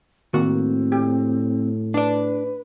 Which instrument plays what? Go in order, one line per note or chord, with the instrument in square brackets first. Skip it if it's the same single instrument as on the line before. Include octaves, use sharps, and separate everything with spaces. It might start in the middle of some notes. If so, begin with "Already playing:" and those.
[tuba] A2 [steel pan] D#3 A#3 [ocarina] C4 [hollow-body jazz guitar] F#4
[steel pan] G4
[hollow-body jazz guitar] D4 D5 [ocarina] B4